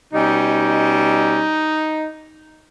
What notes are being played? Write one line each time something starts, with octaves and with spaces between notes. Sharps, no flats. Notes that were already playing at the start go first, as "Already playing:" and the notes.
B2 G3 C#4 D#4